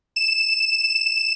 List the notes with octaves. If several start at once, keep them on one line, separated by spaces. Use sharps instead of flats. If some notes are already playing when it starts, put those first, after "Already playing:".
E7